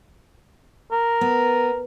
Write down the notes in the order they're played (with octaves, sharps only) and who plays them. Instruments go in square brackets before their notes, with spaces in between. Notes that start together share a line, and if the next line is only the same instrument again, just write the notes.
[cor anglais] A#4
[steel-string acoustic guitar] B3